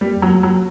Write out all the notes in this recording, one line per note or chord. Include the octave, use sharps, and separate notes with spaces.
G3 A#3
F2
F#3
G3
F#3